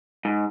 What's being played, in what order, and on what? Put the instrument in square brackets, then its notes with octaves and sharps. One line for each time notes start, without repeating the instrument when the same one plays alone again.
[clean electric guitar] G#2